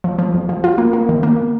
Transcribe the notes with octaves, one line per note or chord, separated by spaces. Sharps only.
F3
F3
F2
F3
F4
A#3
A#3
D#3
A#3